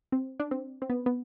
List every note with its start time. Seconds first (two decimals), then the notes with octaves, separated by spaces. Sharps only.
0.12 C4
0.40 D4
0.51 C4
0.82 C4
0.90 B3
1.06 B3